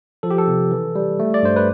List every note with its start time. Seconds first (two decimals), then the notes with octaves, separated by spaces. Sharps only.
0.23 F3 A4
0.31 G4
0.38 A4
0.48 C3
0.71 E3
0.96 G3
1.20 A3
1.34 D5
1.43 G2 C5
1.56 B4